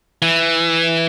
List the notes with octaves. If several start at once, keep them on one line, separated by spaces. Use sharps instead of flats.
E3